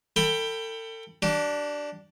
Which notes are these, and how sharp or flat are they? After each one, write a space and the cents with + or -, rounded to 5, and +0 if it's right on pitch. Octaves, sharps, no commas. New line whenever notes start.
A4 +35 G5 +10 B5 +0
D4 +0 G4 -35